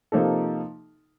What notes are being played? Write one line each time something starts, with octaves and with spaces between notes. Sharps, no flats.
C3 F3 A#3 D#4 A4